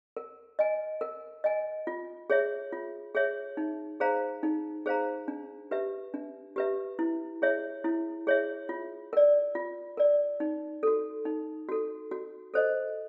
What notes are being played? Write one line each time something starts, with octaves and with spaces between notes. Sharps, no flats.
A#4
D#5 G#5
A#4
D#5 G#5
F4
G#4 C#5 E5
F4
G#4 C#5 E5
D#4
G#4 C5 F5 A#5
D#4
G#4 C5 F5 A#5
D4
G4 B4 E5
D4
G4 B4 E5
E4
G#4 C#5 E5
E4
G#4 C#5 E5
F4
A#4 D5
F4
A#4 D5
D#4
F#4 A4
D#4
F#4 A4
F#4
A4 C5 D#5